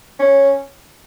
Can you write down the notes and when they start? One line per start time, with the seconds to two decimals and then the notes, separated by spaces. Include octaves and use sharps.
0.19 C#4